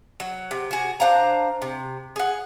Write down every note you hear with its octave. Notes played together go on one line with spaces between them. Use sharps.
F#3
C3
F#4 G#4
D4 C5 F5 A#5
C3
G#4 F#5